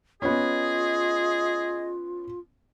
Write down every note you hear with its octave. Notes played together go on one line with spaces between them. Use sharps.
B3 C#4 F4 G#4 D#5